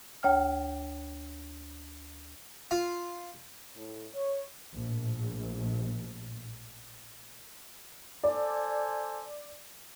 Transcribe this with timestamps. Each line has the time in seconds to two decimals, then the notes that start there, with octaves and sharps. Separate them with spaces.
0.23 D2 C#5 G5 F6
2.71 F4
3.76 A2
4.14 C#5
4.75 A#1 A2
8.23 A4 C5 D5 G#5